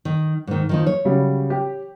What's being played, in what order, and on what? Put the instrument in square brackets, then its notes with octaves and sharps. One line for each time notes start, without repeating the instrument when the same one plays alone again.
[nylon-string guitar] D#3
G#2 D#3
D#3 F3 D#4
C#5
[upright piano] C#3 F#3 G3
G4